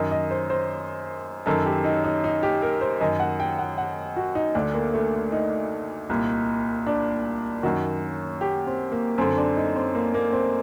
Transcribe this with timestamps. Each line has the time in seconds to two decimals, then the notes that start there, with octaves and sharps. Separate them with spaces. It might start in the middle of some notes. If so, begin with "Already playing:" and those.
Already playing: F#2 D#3 D#5
0.11 D#5
0.31 C5
0.50 C5
1.46 F#2 D#3 A4
1.66 G4
1.84 D#4
2.04 D#4
2.24 D#4
2.43 G4
2.62 A#4
2.81 C5
3.01 F#2 D#3 D#5
3.20 F#5
3.40 G5
3.59 F#5
3.78 F#5
4.16 F#4
4.35 D#4
4.55 D2 D3 D4
4.74 A#3
4.94 A3
5.32 D#4
6.09 C2 A#2
6.87 D4
7.63 F#2 D#3 F#4
8.41 G4
8.67 C4
8.92 A#3
9.18 F#2 D3 C4
9.37 D4
9.57 D#4
9.76 C4
9.95 A#3
10.14 A#3
10.33 C4